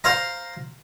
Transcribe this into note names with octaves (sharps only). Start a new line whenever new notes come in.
C5 F5 A#5